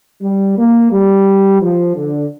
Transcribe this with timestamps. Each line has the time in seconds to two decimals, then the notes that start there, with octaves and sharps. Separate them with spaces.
0.22 G3
0.57 A#3
0.91 G3
1.61 F3
1.95 D3